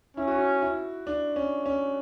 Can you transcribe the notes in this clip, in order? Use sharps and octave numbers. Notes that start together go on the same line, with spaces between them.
C#4 E4
F#4
E4
E4
D4
C#4
C#4